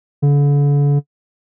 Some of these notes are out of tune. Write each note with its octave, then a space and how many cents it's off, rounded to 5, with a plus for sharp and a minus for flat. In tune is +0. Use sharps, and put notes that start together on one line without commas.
D3 -40